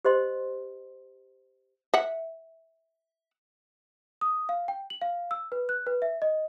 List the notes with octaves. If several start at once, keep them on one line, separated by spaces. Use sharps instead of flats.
G4 C5 D#5 C6
E5 F#5
D#6
F5
G5
F#7
F5
E6
B4
F#6
B4
E5
D#5